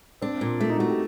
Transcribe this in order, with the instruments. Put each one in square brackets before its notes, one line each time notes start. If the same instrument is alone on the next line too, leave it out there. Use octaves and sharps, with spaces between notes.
[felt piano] C4 [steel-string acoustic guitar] D4
[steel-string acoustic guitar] A#2
A3
[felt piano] D#4
[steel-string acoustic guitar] A3 [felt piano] F#4
[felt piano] G4